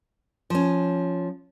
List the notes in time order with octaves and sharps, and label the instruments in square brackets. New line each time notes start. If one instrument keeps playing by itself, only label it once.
[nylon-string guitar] F3 C#4